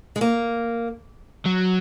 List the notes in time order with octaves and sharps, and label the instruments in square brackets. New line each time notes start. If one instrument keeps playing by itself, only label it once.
[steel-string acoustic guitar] G#3
A#3
[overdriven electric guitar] F#3